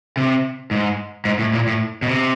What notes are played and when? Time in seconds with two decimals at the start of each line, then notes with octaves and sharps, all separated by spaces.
0.17 C3
0.71 G#2
1.25 G#2
1.39 A2
1.54 A#2
1.67 A2
2.02 B2
2.07 C3